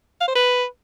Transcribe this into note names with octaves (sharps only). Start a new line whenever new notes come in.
F5
C5
B4